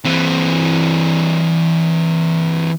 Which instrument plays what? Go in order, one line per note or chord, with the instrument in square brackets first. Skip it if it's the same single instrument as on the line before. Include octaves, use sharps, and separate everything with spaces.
[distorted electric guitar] E3 C4